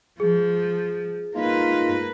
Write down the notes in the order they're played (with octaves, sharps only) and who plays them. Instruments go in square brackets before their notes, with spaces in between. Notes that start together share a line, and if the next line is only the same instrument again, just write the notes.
[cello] F3 [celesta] G#4
[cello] A#3 B4 [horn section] D#4 F4